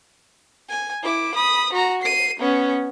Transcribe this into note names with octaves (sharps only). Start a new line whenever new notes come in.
G#5
E4 D6
B5 D#6
F#4 A#5
C7 D#7
B3 C#4